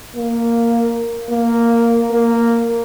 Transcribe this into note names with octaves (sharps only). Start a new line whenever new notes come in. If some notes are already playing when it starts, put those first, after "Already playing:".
A#3
A#3
A#3